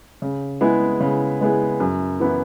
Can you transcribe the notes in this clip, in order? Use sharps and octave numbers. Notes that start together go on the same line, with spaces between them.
C#3
G#3 B3 E4 G#4
C#3
G#3 B3 E4 G#4
F#2
E3 B3 E4